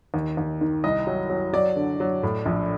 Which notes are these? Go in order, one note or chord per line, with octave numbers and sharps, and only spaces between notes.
D#2
D#2
D#3
C2 D#5
F#3
F#3
F#3 D5
D3
F#3
A2
A#1